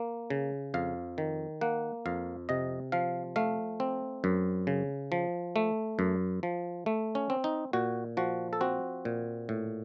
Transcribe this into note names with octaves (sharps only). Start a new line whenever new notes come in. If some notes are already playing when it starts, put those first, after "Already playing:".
Already playing: A#3
C#3
F2 F5
D#3
A#3 F#5
F2 F5
C3 D#5
F3 F5
A3 F5
C4
F#2
C#3
F3
A3
F#2
F3
A3
C#4
C4
D#4
A#2 F#4
F3 F#4
A4
C4 F#4
A#2
A2